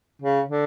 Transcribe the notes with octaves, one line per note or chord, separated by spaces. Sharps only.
C#3
D3